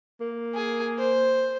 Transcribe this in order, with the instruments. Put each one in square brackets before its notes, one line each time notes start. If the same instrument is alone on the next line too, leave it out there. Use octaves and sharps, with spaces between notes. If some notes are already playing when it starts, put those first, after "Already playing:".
[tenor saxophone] A#3
[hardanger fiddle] G#4
C5